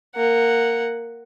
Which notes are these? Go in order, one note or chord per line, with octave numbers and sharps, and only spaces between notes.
A#3 F#5